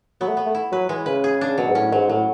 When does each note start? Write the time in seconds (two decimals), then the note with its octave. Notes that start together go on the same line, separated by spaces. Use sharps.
0.21 F#3 B3
0.28 A3
0.37 B3
0.46 A3
0.55 E4
0.72 F#3 B4
0.89 E3 G#3
1.06 C#3 B4
1.24 G#4
1.41 D4
1.58 B2 F#3
1.69 G#2
1.75 A2 C#4
1.92 G#2 F#3
2.09 A2 F#3